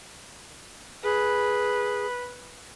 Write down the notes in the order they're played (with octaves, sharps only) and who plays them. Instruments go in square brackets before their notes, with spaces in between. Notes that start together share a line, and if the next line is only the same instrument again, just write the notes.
[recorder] G#4 [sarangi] B4